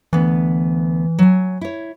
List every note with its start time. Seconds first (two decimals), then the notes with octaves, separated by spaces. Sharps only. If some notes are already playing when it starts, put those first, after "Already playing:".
0.13 D2 E3 B3
1.19 F#3 G#5
1.61 E4 C#5